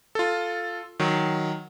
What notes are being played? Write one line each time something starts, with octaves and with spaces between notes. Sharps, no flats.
F4 A4
D#3 F#3